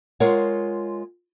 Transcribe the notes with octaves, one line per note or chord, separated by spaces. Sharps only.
G#3 F4 A#4 C#5 F#5